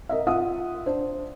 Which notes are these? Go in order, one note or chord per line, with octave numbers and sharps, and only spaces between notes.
A#4 D#5 E5
F4 E5 F#5 D#6
D4 C5